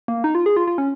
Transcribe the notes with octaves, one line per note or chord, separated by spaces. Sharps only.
A#3
D#4
F4
G#4
F4
F4
C#4